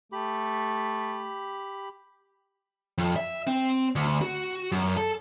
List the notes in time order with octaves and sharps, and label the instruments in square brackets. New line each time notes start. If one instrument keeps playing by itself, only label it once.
[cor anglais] A3 [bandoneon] G4 B5
[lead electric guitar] F2
E5
C4
D2
F#4
F#2
A4